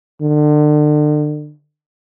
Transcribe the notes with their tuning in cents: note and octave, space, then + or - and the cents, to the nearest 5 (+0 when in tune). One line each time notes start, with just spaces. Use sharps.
D3 +35